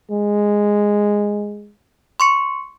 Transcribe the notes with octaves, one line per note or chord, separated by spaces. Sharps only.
G#3
C6 C#6 C#7